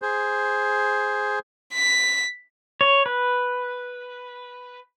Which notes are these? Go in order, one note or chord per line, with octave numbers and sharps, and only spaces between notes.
G#4 C5
B6
C#5
B4